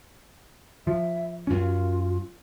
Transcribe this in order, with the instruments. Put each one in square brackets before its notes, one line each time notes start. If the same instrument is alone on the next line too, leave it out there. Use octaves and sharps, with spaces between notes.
[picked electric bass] F3 [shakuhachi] E5
[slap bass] F#2 C#4 [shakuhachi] F4